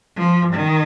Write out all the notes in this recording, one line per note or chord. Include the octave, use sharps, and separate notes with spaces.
F3
D#3